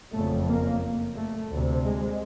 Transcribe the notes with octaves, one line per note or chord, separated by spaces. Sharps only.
F#1 F2 C#3 A3
A#3
A3
D2 C3
G#3